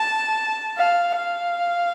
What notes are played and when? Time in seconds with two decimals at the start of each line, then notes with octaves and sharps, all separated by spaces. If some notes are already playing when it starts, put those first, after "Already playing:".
Already playing: A5
0.78 F5
1.16 F5